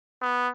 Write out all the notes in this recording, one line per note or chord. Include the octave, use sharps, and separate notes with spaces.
B3